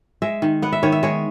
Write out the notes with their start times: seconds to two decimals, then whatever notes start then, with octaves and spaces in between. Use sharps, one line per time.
0.22 G#3 E5
0.42 D#3
0.62 B3 F#5
0.72 E5
0.83 D#3 C#5
0.92 E5
1.03 G#3 C#5